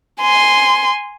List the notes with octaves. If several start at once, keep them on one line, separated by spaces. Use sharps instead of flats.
G#5 C6